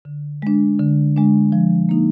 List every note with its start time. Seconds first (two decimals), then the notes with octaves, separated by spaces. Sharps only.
0.05 D3
0.42 G#3 D4
0.79 D3
1.16 G#3 D4
1.52 F3
1.89 A#3 D#4